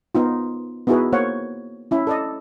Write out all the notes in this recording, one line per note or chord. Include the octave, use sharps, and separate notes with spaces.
B3 D#4 F4
B3 D#4 E4 F#4 G#4 B4
A#3 C5 C#5 F5 F#5
C#4 E4
A4 D5 D#5